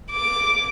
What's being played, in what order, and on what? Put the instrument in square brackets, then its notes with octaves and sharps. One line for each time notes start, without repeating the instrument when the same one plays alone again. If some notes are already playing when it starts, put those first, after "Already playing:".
[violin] D6